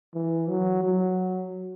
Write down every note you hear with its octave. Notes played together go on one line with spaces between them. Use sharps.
E3
F#3
F#3